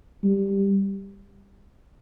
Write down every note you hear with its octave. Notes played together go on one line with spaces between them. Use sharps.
G3